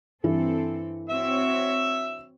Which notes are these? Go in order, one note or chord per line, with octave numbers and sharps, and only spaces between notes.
G2 E3 C4 A4
C4 F#4 C#5 E5 E6